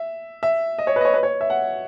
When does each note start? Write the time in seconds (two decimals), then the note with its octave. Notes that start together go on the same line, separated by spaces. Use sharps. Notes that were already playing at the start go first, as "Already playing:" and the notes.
Already playing: E5
0.43 E5
0.79 D#5
0.87 C#5
0.96 B4
1.01 D#5
1.05 C#5
1.14 B4
1.23 C#5
1.41 E5
1.50 F#5